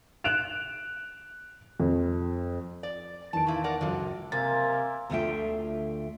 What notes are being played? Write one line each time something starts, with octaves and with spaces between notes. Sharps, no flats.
F#6 D7 E7 F7
F2
D5
E2 D#3 A5 D7
A#2 C#3 E4
A#4 D5 F#5
C#2 F#2 D3 F3
C3 A#3 A#4 E5 G#5 A6
D2 D3 A3 F4 E5 G5